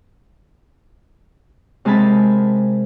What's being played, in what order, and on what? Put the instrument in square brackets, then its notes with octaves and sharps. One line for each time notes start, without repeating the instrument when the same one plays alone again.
[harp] C3 G#3 A#4 G#5 A5 B5